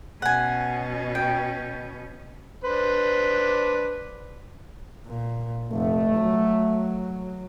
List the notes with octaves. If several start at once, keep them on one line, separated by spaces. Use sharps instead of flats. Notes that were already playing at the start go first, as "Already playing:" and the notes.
B2 C#4 F#5 G#5
G5
D4 B4 C5
A#2
F1 A3
F#3